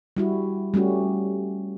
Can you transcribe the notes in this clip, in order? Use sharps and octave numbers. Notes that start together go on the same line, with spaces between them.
G3 E4 F#4
G3 A3 C#4 F#4